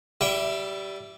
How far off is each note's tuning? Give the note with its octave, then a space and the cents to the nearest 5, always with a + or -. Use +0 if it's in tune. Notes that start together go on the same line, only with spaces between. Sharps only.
G3 -15 E4 +10 G5 +0